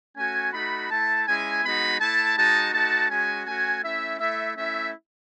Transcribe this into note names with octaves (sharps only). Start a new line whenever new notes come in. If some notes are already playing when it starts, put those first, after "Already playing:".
A3 C#4 F#4 G#5
A3 D#4 F#4 B5
A3 E4 A5
G#3 C#4 E4 G#5
G#3 B3 D#4 F#4 B5
A3 E4 A5
G#3 D#4 F#4 A5
A3 D#4 F#4 A5
G#3 C#4 F#4 G#5
A3 C#4 F#4 G#5
A3 C#4 E4 E5
A3 E4 E5
A3 C#4 E4 E5